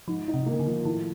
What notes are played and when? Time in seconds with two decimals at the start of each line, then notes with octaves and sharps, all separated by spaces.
0.08 G#2 F3
0.28 D#4
0.34 C3
0.46 A#3
0.53 C#3
0.60 D3
0.67 F3
0.85 A2 D#3